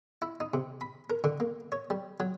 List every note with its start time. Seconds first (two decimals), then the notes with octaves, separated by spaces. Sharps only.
0.22 E4
0.40 D#4
0.54 C3
0.81 B5
1.10 A#4
1.24 D3
1.40 A#3
1.72 C#5
1.90 G3
2.20 F#3